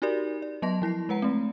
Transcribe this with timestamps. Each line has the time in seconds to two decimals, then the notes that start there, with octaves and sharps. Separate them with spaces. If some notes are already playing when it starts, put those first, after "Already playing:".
0.02 D#4 F#4 G4 A#4 D5
0.42 D5
0.62 F#3 B3 D#5 A5 C6 A#6
0.82 F3 E4 A#6 C7
1.09 G#3 B4 F#5 A#5
1.22 A3 C4